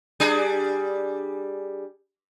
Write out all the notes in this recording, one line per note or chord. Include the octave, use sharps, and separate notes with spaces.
G3 D4 G#4